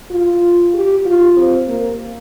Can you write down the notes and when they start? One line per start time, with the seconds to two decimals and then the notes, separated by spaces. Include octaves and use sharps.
0.10 F4
0.74 G4
1.05 F4
1.37 C4
1.68 A#3